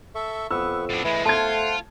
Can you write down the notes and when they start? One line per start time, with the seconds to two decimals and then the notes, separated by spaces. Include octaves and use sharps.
0.15 A4 E5 C#6
0.51 F2 B3 B4 C#6 E6
0.89 A2 B3 D4
1.04 A2 E3 G#3 A3 G#5 B5
1.25 A3 F4 C5 F#5 A5 C6 G#6